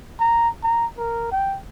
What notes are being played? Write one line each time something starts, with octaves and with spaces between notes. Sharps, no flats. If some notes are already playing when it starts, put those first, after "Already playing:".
A#5
A#5
A#4
G5